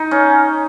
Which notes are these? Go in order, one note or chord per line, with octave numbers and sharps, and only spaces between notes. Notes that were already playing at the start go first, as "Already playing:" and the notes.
Already playing: D#4
C#4